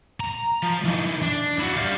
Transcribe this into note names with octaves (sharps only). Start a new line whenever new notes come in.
A#5
F3
E3 D#4
D4
E4 F#4
G3 F5